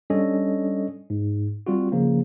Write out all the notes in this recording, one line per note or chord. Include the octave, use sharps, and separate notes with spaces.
G3 C#4 D4 A4 C#5 D#5
G#2
G3 C4 F4 F#4
C#3 F3 A#3